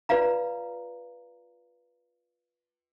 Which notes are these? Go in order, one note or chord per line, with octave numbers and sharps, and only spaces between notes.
F4 B4 D5 F5 A#5